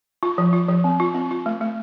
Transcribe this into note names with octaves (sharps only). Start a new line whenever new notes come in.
F4
F3
F4
F3
C4
F4
C4
F4
A3
A3